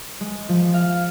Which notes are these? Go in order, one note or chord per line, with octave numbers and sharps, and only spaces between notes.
G#3
F3
F5